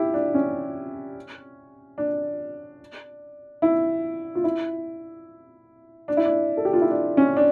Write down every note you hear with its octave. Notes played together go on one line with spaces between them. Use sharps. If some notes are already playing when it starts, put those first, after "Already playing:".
Already playing: E4 G4
D4
C#4
D4
E4
F4
E4
D4
E4
D4
A4
G4
F4
E4
D4
C#4
D4